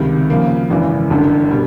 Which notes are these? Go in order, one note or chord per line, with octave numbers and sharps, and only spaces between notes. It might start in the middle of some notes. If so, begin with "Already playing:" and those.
Already playing: C#2 C3 D#3 G3
C#3 F3 A#3
G#1 F#2 C#3 E3
G1 F#2 D3
B2 G3